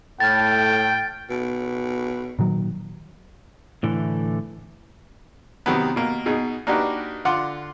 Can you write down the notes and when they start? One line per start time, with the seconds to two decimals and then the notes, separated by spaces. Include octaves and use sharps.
0.20 A2 G5 F6 G#6 A6
1.30 B2
2.39 A#2 D#3 F#3
3.83 A2 D3 E3 A3
5.66 C3 D#3 F#3 B3
5.96 B2 A#3
6.26 B2 D#4 G#4
6.67 A#3 D4 D#4 F#4 G4 B4
7.25 D3 F4 F#5 C6 D6